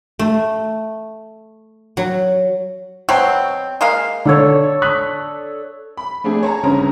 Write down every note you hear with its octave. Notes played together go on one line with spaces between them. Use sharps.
A3
F#3
B2 F#3 C4 G5
G#3 A#3 F5
D3 D4 A4 C#5
D#6 F#6 B6
B5
A3 C4 D4 G#4 G#5
C#5 A5 A#5
G1 G2 C#3 C4 C#4 A#5